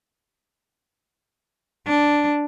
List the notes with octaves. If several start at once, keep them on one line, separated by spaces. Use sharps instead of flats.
D4